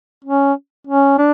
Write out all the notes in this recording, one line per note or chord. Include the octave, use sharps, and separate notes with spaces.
C#4
C#4
D4